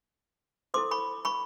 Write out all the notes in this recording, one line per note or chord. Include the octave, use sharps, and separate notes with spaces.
E4 A4 C5 C6 D6
B5 C#6
B5 C#6